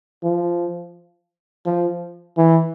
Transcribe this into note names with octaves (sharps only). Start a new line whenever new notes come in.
F3
F3
E3